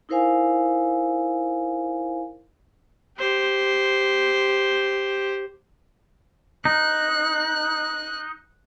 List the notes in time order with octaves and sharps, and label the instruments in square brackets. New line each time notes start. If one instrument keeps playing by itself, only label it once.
[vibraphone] D#4 E4 A#4 C5 F5 G#5
[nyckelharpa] G4 C5
[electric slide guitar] D#4 [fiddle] F#6